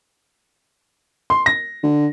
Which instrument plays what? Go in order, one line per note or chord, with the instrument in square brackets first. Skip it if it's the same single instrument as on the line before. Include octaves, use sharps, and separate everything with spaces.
[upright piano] C6
A#6
[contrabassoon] D3